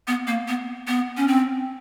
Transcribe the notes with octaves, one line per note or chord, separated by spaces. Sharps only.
B3
A#3
B3
B3
C#4
C4